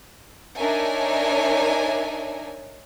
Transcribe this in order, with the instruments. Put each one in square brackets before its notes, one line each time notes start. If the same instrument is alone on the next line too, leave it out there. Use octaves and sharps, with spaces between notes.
[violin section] D4 D#4 A#4 C#5 E5 G#5